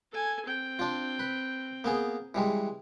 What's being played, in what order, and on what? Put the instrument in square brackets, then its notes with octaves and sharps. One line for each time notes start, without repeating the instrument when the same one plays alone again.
[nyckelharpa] A4 G#5
C4 G5
[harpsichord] D4 F4
B4
A#3 B3 G#4
E3 G3 G#3